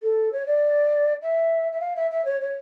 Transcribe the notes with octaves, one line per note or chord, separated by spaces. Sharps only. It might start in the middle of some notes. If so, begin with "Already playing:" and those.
A4
C#5
D5
E5
E5
F5
E5
E5
C#5
C#5